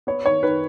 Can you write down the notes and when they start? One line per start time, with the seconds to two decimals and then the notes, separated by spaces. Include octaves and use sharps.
0.07 B3 C#5
0.26 D#3 C#5
0.43 D#3 B4